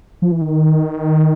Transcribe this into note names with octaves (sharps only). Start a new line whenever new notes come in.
F3
E3
D#3